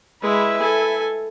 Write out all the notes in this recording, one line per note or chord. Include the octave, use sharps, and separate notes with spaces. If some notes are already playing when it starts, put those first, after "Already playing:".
G#3 E4 B4 E5
A4 G#5